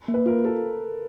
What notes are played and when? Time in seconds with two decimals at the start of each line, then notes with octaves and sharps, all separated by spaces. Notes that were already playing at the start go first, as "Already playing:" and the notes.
0.08 A#3
0.14 B4
0.26 F4 A#4
0.44 A4 A#4